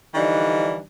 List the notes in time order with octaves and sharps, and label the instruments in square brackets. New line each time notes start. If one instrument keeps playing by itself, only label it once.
[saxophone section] D3 E3 F3 G3 D4 D#4